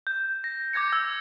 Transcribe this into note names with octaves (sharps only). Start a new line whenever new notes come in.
G6
A#6
D6 G6 G#6 A#6 C#7
E6 G#6